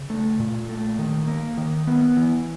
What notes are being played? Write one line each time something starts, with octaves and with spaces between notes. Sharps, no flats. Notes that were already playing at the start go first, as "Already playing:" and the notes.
Already playing: C#3
A3
A#2
A3
D#3
A#3
D#3
B3
E3